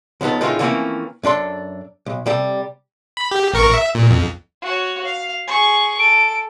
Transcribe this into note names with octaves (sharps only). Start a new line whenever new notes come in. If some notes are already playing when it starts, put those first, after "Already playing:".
C#2 F3 B3 D#4 A4
A2 D#3 G#3 A3 C#4 F4
E3 F3 A3 A#3 C4 C#4
F#2 D4 A4 C6
B1
C3 G3 A4
B5
G4
A1 A#4 C#6
E5
A#2
F2
F#4 C#5
F5
G#4 C#6
A4 D7